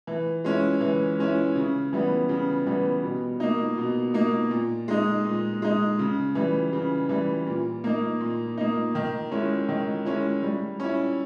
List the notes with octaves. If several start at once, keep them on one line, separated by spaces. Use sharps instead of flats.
E3
G#3 C#4 E4
E3
G#3 C#4 E4
C#3
E3 G3 B3
C#3
E3 G3 B3
B2
A#3 D#4
B2
A#3 D#4
A#2
G#3 D#4
A#2
G#3 D#4
C#3
E3 G3
C#3
E3 G3
A#2
A#3 D#4
A#2
A#3 D#4
D#3
G#3 C#4 E4
D#3
G#3 C#4 E4
G3
C#4 E4